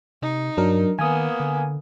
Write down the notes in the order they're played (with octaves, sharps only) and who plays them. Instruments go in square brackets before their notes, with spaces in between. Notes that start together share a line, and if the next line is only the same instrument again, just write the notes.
[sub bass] C3 [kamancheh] D#4
[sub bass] G2 [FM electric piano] F#3 D4 A#4
[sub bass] D#3 [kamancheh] A#3 B3 [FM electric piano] G#5 D#6
[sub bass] D3